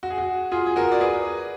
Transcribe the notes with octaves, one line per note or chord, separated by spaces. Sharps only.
F#4
G#4
F#4
F4 G#4
G#4
F#4 A#4
D5
G#4 B4